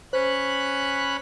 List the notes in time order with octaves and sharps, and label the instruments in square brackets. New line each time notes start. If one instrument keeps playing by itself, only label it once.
[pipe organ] C#4 B5 F#6 [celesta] C5